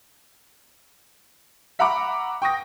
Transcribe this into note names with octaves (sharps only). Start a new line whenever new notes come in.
E5 F#5 A#5 B5 C#6 D6
G5 C#6 D#6 A#6